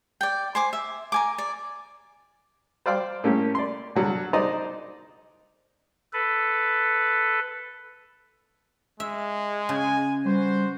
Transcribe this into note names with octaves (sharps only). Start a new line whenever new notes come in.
D5 G5
C5 G#5 D6
E5
A#4 G#5 D6
D5
C5 D5 F5 G5 C6 D6
A2 A#3 C#4 G4
D5 C6
D3 F#3 G3
D#4 C5 D5 D#5 A#5
A4 B4
G#3 E5
C#3 G#5
G3 F#4 B4 C5